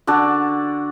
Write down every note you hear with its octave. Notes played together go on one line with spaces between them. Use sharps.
D3 F#4 D5 A5